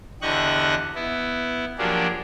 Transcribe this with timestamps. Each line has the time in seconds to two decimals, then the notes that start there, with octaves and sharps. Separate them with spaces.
0.22 E2 D3 G4 D#5 C#6 F#6
0.96 B3 E4
1.78 F3 F#3 A#3 D4 G4 G#4